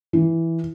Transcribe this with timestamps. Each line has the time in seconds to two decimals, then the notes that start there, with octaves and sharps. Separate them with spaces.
0.13 E3